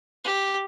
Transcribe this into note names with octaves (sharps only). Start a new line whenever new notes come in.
G4